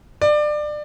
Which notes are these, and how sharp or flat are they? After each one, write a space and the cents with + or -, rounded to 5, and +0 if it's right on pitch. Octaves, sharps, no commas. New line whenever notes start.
D5 +25